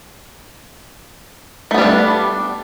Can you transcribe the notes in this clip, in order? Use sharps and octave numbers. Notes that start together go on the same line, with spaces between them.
G3 A3 B3 D4